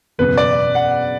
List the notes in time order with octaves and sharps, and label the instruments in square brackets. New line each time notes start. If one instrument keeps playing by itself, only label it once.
[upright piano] F#1 E2 B2 [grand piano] B4
[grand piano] D5
F#5